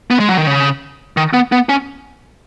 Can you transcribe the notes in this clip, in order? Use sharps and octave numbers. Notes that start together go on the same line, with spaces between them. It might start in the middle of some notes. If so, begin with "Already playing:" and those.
B3
G#3
F#3
D#3
C#3
D#3
B3
B3
C#4